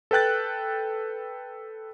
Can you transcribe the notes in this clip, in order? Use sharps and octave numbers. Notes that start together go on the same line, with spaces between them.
A4 B4 G5 F#6 A6